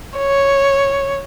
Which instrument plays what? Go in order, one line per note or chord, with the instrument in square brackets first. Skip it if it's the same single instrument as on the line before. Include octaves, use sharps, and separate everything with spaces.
[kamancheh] C#5